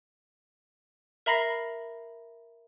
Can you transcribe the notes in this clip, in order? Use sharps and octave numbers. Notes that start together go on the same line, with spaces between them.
A#4 E5 A#5 B5 A#6 C7